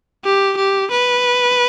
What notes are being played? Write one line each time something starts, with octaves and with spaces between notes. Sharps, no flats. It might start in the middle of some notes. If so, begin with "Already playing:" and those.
G4
G4
B4